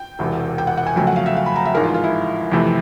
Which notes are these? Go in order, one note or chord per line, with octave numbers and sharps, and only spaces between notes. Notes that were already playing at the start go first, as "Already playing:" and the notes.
Already playing: G5
E1 E2 C3
G5
F#5
F#5
G#5
F2 C#3 F#3 A3 G5
F#5
F5
E5
F5
B5
A#5
E5
A1 G#2 F3 G#3 A#4
F4
F4
E4
F2 C3 E3 A3